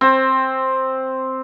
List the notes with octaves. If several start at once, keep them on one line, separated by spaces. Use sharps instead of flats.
C4